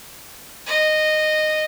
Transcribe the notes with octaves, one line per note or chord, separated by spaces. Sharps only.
D#5